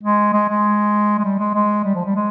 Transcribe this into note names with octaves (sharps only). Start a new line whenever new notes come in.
G#3
G#3
G#3
G#3
G3
G#3
G#3
G3
F3
G3
G#3